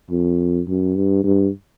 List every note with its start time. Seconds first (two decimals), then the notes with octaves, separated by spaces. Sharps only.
0.11 F2
0.68 F#2
0.96 G2
1.24 G2